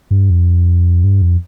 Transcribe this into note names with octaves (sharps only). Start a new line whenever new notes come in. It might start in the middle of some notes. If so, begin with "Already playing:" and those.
G2
F2
G2
F2